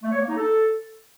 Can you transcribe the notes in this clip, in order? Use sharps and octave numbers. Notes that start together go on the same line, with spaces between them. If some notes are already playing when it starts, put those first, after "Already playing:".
A3
C#5
A#3
D#4
A4